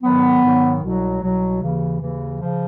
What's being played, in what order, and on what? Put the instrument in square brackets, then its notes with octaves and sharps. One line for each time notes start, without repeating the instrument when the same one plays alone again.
[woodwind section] G#2 D#3 F#3 B3
G#2 D#3 F#3
C2 B2 F#3
C2 B2 F#3
D#2 C#3 E3
D#2 C#3 E3
C#3 F3